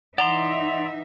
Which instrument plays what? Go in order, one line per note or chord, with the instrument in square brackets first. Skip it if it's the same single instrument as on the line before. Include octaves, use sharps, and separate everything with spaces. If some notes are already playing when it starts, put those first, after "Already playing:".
[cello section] E3 D#4 E5 [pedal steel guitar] D5 A#5 C6 [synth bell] F#5